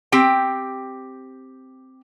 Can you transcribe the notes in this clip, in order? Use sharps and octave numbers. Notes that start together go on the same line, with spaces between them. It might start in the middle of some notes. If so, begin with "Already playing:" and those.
C4 G4 G5